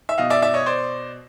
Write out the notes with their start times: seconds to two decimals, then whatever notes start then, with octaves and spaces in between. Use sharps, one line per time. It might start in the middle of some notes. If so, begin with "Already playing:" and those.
0.09 E5
0.18 B2 D#5 F5
0.30 D5 E5
0.42 D5 E5
0.54 C#5 D#5
0.66 C5 D5